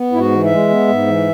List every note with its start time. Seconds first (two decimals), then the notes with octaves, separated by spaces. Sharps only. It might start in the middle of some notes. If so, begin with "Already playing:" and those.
Already playing: B3
0.12 G#2 E4
0.19 F#4
0.31 E3
0.44 E5
0.50 G#3
0.69 B3
0.88 G#2
1.07 E3